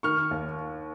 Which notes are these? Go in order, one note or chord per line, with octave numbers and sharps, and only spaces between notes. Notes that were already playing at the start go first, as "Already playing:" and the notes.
D#3 C#6 F6
D#2